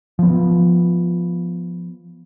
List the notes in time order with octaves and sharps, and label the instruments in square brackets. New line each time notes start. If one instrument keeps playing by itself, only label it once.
[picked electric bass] F3 B3